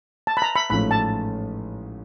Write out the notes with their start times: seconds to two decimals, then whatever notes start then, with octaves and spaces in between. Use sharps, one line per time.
0.27 A5
0.37 B5
0.42 A#5
0.56 B5
0.70 A1 G#2 F3 A3 C#4 B5
0.91 A5